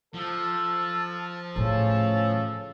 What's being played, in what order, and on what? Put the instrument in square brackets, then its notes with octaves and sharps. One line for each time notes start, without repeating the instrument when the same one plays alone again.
[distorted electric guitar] F3 [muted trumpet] A4
[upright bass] A2 A3 [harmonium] C#3 C#4 [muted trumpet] A4